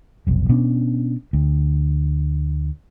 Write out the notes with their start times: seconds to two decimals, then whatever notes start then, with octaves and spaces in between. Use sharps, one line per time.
0.27 F1 B1
0.49 B2 B3 C#4 D4
1.33 D2